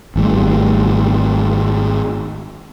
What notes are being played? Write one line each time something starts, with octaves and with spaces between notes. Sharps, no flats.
G#1 G3 A3